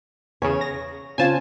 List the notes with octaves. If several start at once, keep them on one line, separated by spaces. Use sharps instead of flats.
E2 C#3 C#5
A#6
C#3 C4 F4 G#5 A5